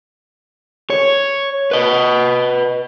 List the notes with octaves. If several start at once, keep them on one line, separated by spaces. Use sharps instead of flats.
C#5
B4 D#5